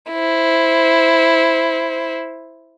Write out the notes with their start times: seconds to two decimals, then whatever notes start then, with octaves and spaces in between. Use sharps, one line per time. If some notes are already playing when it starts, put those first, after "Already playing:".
0.12 E4 C5